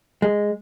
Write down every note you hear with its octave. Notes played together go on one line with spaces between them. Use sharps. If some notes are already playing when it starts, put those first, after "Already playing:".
G#3